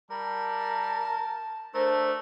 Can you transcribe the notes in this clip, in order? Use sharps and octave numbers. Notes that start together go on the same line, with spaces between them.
G3 A#4 A5
A3 D4 A#4 C5